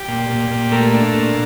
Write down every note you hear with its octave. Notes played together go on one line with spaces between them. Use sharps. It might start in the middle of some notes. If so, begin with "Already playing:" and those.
Already playing: G4
A#2
A#2
A#2
A3 A#4
D4
A#2